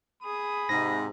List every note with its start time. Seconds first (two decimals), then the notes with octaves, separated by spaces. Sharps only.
0.23 G#4 B5 D#6
0.69 G#2 C3 A#6